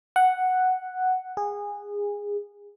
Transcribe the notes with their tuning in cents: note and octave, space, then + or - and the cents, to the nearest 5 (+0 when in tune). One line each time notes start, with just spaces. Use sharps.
F#5 +0
G#4 -20